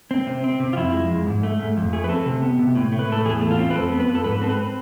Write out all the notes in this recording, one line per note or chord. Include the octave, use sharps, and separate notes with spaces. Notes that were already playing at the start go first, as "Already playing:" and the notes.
C4
C3
C4
C3
F4
F2 E4
G#3
F2
G#2
A3
G#2
F2
A3 G#4
B4
C4 A4
C3
B3
C3
A2
A3
B4
A2 A4
E2 G#4
A3
F4
C4
B4
F2 A4
B3
B4
F2
A4
G#2 B4
C4 A4
B4